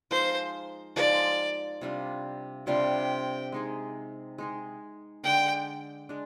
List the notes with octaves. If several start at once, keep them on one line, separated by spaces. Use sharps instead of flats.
F3 G#3 D#4 A#4 C5
F3 G#3 D#4 A#4 D5
C3 G3 D4 F4
C3 G3 D4 F4 G5
G#3 D#4 G#4
G#3 D#4 G#4
D3 G#3 D4 G5
G#3 D4